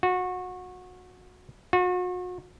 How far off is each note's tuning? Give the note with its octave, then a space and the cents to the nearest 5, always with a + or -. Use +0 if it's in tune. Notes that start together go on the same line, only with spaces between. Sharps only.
F#4 -25
F#4 -40